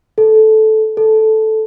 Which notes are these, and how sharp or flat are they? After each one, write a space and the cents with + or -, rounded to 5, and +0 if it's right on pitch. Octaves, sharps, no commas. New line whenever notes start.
A4 -10
A4 -5